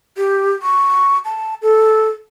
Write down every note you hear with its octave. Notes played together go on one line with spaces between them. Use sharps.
G4
C#6
A5
A4